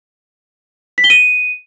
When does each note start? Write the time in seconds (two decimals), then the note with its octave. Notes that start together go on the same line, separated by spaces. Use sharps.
0.98 B6
1.04 G7
1.10 D#7